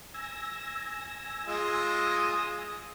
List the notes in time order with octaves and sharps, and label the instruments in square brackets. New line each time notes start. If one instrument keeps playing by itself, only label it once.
[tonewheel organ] G#5 E6 A#6
[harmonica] G#3 F4 [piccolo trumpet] D#6